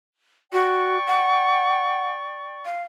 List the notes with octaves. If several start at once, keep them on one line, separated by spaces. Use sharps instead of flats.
F#4 D5 G5 C#6
F#5
F5